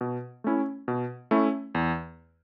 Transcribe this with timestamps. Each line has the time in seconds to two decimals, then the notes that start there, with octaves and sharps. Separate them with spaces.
0.01 B2
0.44 A3 C#4 E4
0.88 B2
1.31 A3 C#4 E4
1.75 E2